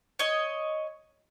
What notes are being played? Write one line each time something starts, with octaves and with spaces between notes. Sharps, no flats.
C#5 D#5